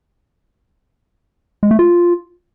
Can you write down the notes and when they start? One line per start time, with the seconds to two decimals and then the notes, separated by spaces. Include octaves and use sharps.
1.63 G#3
1.71 A3
1.79 F4